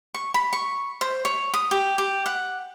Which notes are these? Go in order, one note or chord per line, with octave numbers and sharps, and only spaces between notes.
C#6
B5
C#6
C5
C#5
D#6
G4
G4
F#5